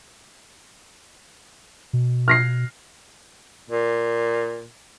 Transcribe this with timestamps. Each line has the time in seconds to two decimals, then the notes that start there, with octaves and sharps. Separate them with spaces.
1.93 B2
2.28 F6 A#6 C7
3.70 A#2